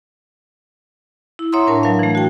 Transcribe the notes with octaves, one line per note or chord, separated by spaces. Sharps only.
E4
C#5 E5 F#5 A#5 C6 D#6
A2 D4 A#4 A5
F#3 B4 F5
E3 A3
F#4 G5